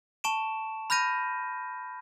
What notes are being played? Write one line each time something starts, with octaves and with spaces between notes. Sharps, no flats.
A5 C#6 D7 E7
B5 F6 G6 A#6 D#7